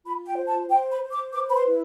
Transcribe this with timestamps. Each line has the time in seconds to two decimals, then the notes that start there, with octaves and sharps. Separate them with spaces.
0.05 F4 B5
0.27 G5
0.37 C5
0.48 A5
0.69 C5 G5
0.91 B5
1.01 C5
1.12 D6
1.33 B4 D6
1.49 B5
1.55 C6
1.66 E4